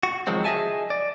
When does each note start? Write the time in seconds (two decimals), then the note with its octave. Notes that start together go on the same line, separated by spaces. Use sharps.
0.03 F#4
0.27 C#2 D#3 F3 F#3 G#3 C4
0.44 G#4 D#5 E5 G#5 A5
0.90 D5